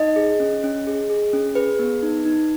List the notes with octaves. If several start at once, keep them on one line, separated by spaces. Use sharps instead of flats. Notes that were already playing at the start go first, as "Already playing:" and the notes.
Already playing: D#4 D#5
G#4
C#4
C#4
G#4
G#4
C#4
G#4 B4
B3
D#4
D#4